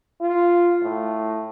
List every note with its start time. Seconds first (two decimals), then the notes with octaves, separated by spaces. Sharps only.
0.21 F4
0.83 A2